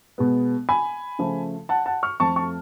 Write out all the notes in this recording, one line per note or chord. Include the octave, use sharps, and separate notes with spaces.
B2 G#3 B3
G#5 B5
C#3 F3 A3
F#5 A5
F#5 A5
C#6 F6
F2 F3 A3 A5 C#6
A5 C#6